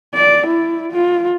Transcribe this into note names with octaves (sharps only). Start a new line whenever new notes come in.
D5
E4
F4